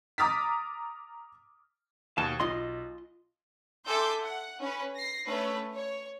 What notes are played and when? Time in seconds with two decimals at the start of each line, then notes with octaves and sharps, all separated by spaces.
0.18 A#5 D6 D#6 F6 A6 B6
2.18 D#2 B2 A5
2.40 B1 F4 D#5 C6
3.88 A4 E5 G#5 C6 D6 G6
4.23 F#5
4.60 C#4 B4
4.95 A#6 C7
5.26 A3 C#4 B4
5.75 C#5